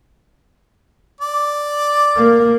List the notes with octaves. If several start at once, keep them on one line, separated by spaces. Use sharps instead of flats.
D5
A#3